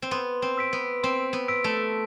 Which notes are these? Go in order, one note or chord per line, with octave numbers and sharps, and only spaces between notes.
C4
B3 C6
C4
E6 B6 D7
B3
C4 C6
B3
E6 B6 D7
A3